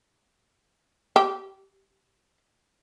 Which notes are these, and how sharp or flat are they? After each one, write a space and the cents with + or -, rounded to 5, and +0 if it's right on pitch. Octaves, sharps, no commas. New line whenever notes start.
G4 -25